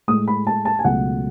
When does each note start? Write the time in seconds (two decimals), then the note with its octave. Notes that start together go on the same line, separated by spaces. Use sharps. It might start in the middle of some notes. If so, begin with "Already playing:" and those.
0.08 A2 G#3 D#6
0.28 B5
0.47 A5
0.65 A5
0.79 G#5
0.85 C#2 B2 F#3 A3 F#5